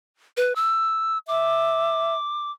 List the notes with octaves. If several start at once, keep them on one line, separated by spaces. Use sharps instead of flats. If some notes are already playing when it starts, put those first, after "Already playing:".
B4
E6
E5 D6